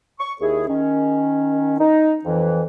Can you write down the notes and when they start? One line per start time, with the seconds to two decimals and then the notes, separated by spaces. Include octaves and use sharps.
0.18 C#6
0.40 D#2 E4 G#4
0.67 D#3 C#4
1.78 D#4
2.25 F2 E3